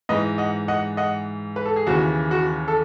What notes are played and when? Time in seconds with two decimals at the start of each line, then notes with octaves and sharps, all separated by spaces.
0.09 G#2 E3 B4 D#5
0.38 D#5 F#5
0.68 D#5 F#5
0.97 D#5 F#5
1.56 B4
1.65 A4
1.76 G#4
1.87 D#2 C#3 E3 F#4
2.31 F#4
2.68 A4